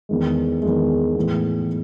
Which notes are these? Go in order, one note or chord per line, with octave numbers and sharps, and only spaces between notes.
E2 D#3 G#3
E2 D#3 G#3
A2 E3 G#3 B3